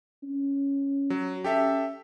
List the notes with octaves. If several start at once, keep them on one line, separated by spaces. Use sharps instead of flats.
C#4
F#3
C#4 G4 A4 E5